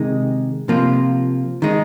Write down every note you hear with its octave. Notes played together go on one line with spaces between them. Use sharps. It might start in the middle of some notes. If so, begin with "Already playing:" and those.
Already playing: C3 D#3 G#3 D#4
C3 F3 A#3 F4
D#3 G#3 D#4